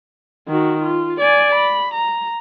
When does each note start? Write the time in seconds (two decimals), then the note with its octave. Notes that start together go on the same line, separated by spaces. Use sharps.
0.49 D#3 F#4
0.82 F4
1.20 D5 G#5
1.55 B5
1.94 A#5